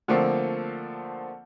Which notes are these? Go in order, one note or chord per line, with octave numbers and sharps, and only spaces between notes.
D3 F3 A3 A#3 C4